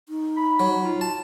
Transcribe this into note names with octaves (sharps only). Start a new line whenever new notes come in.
D#4
B5
F#3
F4
A5